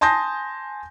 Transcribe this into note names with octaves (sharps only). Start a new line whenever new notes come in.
G#5 A5 C6 D#6 G6 A#6